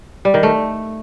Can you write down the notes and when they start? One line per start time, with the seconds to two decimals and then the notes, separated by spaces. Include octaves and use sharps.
0.25 G3
0.34 D#3
0.43 A3